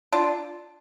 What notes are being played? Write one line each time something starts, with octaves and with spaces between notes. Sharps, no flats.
D4 F4